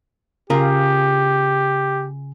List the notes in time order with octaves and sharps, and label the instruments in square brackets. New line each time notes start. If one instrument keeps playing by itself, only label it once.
[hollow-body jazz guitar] C#3 F4 A#4 [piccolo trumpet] G4